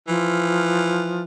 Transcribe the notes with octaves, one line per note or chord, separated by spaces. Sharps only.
E3 F3